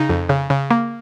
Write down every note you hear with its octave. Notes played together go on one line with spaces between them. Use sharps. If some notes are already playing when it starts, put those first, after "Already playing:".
Already playing: C#3 D#4
F2
C#3
C#3
A#3